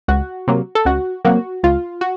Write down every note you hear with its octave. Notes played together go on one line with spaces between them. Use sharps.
C#2 F#4
C3 F#3 A#3
A4
C#2 F#4
C3 F#3 A#3 F#4
C#2 F4
F#4